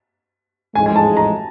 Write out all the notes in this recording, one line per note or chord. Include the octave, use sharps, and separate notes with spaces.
A1 G#2 F3 G#3 G#5
G#5
A5
A#5